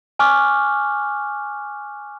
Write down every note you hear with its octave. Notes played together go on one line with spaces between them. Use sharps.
G#5 C#6 D6 F6 F#6